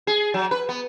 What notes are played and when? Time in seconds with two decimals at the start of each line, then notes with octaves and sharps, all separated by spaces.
0.07 G#4
0.34 F#3
0.51 B4
0.69 B3